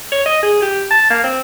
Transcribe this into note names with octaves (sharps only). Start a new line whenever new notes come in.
C#5
D#5
G#4
G4
A5
A#3
C4